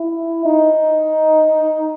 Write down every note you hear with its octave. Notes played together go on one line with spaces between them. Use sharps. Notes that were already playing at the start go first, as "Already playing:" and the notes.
Already playing: E4
D#4